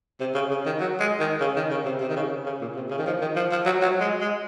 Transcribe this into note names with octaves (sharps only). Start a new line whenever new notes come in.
C3
C#3
C#3
D#3
F#3
G#3
D#3
C#3
D#3
C#3
C3
C3
D#3
C#3
C#3
A#2
C3
C#3
D#3
F3
D#3
F3
F3
F#3
F#3
G#3
G#3